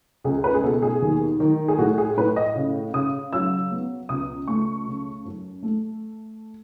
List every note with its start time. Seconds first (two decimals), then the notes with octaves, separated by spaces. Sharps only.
0.24 C#2 G#4
0.44 B4
0.54 G#4
0.63 B2 A4
0.82 G#4
1.02 D#2
1.40 D#3
1.68 G#4
1.78 A2 F#4
1.98 G#4
2.17 A2 B4
2.36 D#5
2.56 C#3
2.94 C#3 D#6
3.33 F#3 E6
3.71 B3
4.09 C#2 D#6
4.48 A3 C#6
4.86 C#3
5.25 F#2
5.63 A3